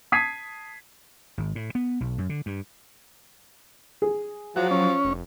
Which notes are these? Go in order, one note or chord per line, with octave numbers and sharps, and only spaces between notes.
A5 D#6 G#6 B6 C7 D#7
G#1
A2
B3
B1
F#2
D3
G2
G#4
F3 F#3 F#4
C#4
F1